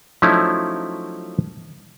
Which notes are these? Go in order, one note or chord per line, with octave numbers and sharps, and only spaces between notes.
F3 F#3 A3 C#4 D#4 E4